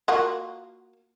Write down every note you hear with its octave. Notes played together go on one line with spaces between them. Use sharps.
A#3 F4 F#4